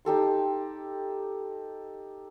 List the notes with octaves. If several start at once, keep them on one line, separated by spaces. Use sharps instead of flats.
D#4 G4 A4 C6